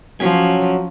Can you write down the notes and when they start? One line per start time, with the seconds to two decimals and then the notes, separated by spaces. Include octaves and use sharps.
0.20 F3 F#3 C#4 G#5